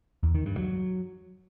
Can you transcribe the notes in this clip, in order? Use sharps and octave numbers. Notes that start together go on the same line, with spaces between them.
E2
D#3
G2
F#3